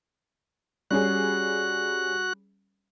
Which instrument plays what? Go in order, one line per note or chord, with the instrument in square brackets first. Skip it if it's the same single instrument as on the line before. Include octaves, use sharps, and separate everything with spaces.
[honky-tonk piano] G3 C#4 G#4 [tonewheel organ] F#4 F#6